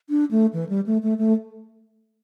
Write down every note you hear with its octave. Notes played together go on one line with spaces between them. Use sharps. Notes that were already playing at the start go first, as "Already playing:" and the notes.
D4
A3
E3
G3
A3
A3
A3